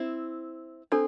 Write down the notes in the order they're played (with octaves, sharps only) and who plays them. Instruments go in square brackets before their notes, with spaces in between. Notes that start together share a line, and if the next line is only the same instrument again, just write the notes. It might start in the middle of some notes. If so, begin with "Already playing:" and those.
Already playing: [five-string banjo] C4 E4
[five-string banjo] C4 [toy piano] D4 A4